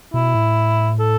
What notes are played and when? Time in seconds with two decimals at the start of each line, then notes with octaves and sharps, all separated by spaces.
0.14 B2 E4
0.35 A2
0.99 A4